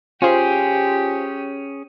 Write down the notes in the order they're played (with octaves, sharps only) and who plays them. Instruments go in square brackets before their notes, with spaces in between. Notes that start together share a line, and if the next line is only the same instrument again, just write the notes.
[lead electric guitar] C#4 G#4 [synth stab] F4 C5 [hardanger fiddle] G4